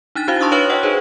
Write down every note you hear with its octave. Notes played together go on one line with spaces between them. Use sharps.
D4 D#4 F#6 A6
D4 E4 F#4 C5 F5
A5 C6 C#6 D#6 E6 F#6
B4 C#5 F5 F6 F#7
C#5 D#5 F#5 G5
D#4 G#4 B4 C5